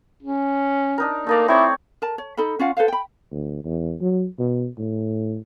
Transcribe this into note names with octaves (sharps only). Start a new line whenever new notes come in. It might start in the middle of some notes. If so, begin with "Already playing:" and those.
C#4
D4 D#4 A#4
A3 A#3 D#4 D5
C4 E4 C#5 D5
A#4 A5
C#5
D#4 A4 D#5 B5
C#4 F4 F5 F#5
A4 B4 C5 F5
G5 B5
D2
E2
F#3
B2
A2